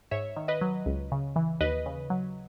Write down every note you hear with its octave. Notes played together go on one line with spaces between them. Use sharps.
G#2 C#5 E5
D#3
B4 D#5
F#3
C#2
C#3
E3
D#2 B4 D#5
C#3
F#3